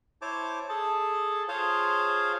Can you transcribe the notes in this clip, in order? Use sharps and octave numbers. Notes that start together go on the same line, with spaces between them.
E4 C5 C#5 A5 D6
G#4 A4 A5
F4 G#4 C5 C#5 F5 A5